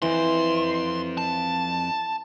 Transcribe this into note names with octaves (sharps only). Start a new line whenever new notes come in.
F2 E3 C5 C6
A5